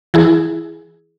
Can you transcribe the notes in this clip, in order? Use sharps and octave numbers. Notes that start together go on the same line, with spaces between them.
E3 E4 G#4